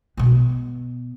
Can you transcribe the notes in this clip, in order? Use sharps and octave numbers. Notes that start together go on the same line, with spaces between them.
B2 B3